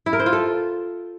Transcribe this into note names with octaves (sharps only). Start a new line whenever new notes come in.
E4
A#4
C5
F4
A4